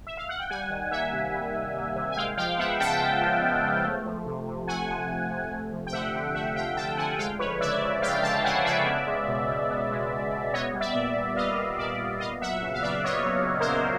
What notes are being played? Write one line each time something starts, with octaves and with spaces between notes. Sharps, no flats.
E5
F5
F#5
G5
G3 F#5 G#5
D#3
A#3 E5 F#5
C3
G3
D#3
A#3
C3
G#5
G#3 F5 G5
F3 F5 G5
B3 E5 F#5
C#3 G5 A5
G#3
F3
B3
C#3
A3
F3
C3
C3
A3 F#5 G#5
F3
C3
C3
A3
F3
G5
D3 E5 F#5
D3
A3 E5 F#5
F3 F5 G5
D3 G5 A5
D3 F#5 G#5
G#3 F5 G5
F3 B4 C#5
C#3 D5 E5
C#3
G#3 F5 G5
F3 G5 A5
C#3 F#5 G#5
C#3 D5 E5
B3
G#3
B2
B2
B3
G#3
B2
B2
B3 C#5 D#5
G3
D5 E5
A#2
A#2
B3 D#5 F5
G3
A#2 D5 E5
A#2
B3 D#5 F5
F#3 E5 F#5
C#3
F5
C#3 D5 E5
B3 C#5 D#5
F#3
C#3
A#4 C5
C#3